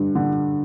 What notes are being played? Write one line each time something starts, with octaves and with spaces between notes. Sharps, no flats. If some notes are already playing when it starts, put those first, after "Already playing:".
Already playing: G2 D3
D3